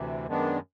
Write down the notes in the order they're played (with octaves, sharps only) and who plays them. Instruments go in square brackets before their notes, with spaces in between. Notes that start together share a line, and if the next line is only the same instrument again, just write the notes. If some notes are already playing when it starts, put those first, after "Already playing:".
Already playing: [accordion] D2 C3 E3
F#2 D#3 G#3 B3 D4